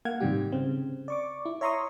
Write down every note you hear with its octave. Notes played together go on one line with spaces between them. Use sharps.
A#3 F5 F#5 G#6
G#2 C3 D#3 G3 G4
C#3 C4
D5 C#6 D6
E4
C#5 E5 A#5 C6 C#6 D#6